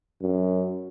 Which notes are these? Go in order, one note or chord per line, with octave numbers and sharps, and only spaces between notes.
F#2